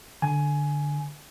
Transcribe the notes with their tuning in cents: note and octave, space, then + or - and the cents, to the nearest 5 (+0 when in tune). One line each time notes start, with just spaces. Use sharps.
D3 +0 G#5 +15